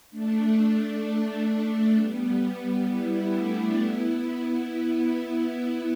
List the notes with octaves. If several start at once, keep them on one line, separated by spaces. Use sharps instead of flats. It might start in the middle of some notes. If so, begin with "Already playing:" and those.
A3 D4
G3 B3
B3 E4
A3 D4
B3 E4
B3 E4